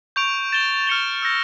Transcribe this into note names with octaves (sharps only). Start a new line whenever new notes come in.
C#6 G6 D7 F7
A6 E7 G7
F6 A6 C#7 G7
E6 G6 A#6